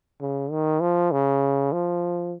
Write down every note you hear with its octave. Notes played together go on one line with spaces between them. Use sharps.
C#3
D#3
F3
C#3
F3